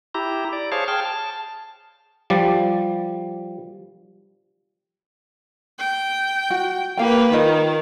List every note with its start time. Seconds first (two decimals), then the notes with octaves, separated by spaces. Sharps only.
0.15 E4 G4 A#5
0.53 D5
0.72 G#4 C5 C#5 F5 A5
0.88 G#4 G5 A5 F6
1.05 A5
2.30 F3 G3 D5
5.79 G5
6.50 F#4
6.98 A#3 G4 B4 F5 G5
7.32 D#3 F4 D#5